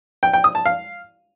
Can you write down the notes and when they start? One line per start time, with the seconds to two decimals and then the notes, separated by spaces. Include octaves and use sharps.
0.23 G5
0.33 G5
0.44 D#6
0.55 A5
0.66 F5